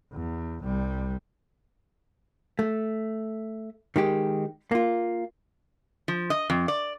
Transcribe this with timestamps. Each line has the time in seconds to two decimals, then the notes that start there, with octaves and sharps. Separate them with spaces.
0.13 E2
0.64 C2 G3
2.59 A3
3.96 D#3 G#3 G4
4.71 A#3 F4
6.08 F3
6.30 D#5
6.50 F2
6.68 D5